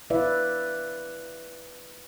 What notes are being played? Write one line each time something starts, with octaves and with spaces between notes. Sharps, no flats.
E4 B4 D5 E5 F5